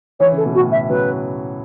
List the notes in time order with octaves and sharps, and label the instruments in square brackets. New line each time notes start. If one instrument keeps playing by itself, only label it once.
[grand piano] E3 [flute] C#5
[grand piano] C#3
[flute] A4
[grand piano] B2
[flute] F#4
[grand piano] A2 C#3
[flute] E5
[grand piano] C#3 F#3 [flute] B4